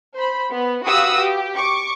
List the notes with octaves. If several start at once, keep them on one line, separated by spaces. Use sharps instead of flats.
C5 B5
B3
F#4 G4 B4 F5 D#6 E6
G4
C#6 D6